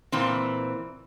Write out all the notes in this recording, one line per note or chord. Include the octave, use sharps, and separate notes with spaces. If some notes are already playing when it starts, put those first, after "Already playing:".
A#2 E3 C4